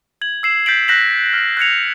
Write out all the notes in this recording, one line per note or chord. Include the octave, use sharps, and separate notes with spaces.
G#6 F#7
E6 C7 E7
G6 A6 B6 C7 D7 F#7
F#6 G6 A#6 B6 E7 F#7
F6
F#6 G#6 A#6 C#7 F7